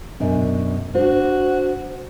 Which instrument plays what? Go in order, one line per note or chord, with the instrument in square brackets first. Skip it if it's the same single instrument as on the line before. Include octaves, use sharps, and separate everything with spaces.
[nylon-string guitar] F#2 B2 D4
[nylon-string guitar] D4 C5 [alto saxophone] F#4